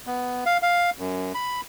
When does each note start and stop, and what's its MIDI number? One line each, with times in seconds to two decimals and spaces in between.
0.07 0.44 59
0.46 0.58 77
0.62 0.90 77
0.99 1.33 42
1.35 1.61 83